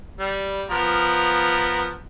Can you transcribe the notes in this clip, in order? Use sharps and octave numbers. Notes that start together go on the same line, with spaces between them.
G3
F3 B3 A#4